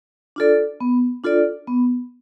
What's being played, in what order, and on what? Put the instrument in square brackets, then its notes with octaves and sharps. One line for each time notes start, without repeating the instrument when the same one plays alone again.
[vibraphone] D4 F4 A4 D5
B3
D4 F4 A4 D5
B3